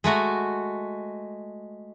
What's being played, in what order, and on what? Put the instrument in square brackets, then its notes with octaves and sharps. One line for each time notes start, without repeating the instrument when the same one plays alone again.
[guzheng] G#3 A3 F#4 A#5